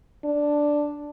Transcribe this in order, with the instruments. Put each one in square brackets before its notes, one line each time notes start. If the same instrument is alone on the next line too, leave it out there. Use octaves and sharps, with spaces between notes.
[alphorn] D4